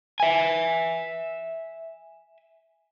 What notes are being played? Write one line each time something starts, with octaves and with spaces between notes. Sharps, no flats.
E5 G#5